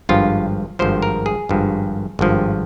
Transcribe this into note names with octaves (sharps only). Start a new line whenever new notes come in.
G#1 G2 F3 F4
G#1 G2 F3 C5
A#4
G#4
G#1 G2 F3
G#1 G2 F3